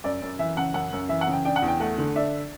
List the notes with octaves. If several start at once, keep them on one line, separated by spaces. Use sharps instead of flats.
F#2 D5
F#2
E3 E5
C#3 F#5
F#2 F#5
F#2
E3 E5
F#5
C#3
G5
D4 G5
F#5
E2
G5
A3 F#5
D3
D4 E5